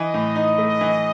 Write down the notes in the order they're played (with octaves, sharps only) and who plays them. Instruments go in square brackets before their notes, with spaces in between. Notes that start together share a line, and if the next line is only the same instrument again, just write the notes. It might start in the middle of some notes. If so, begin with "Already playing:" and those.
Already playing: [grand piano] E3 [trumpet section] D#5
[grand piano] A2
D#4
A3
E3